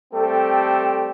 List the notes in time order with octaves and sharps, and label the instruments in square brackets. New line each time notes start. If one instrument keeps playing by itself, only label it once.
[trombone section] G3 A3 C4 G4 A4